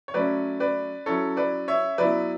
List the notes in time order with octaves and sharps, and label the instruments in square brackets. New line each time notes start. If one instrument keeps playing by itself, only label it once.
[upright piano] C#5
F#3 A3 C#4 B4 D5
B4 D5
F#3 C#4 E4 A4 C#5
B4 D5
C#5 E5
F#3 B3 E4 B4 D5